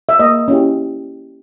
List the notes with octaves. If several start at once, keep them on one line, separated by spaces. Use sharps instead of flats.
E5
A#3 D#5
C#4 E4 G4